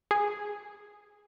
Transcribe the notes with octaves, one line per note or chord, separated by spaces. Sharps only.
G#4